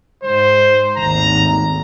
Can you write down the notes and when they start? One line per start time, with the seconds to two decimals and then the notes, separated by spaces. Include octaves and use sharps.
0.23 G#2 C5
0.97 G#1 D#2 A2 A#5